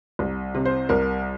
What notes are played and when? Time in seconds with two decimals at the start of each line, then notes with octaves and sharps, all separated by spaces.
0.19 C2
0.54 C3
0.65 C5
0.89 C2 A#4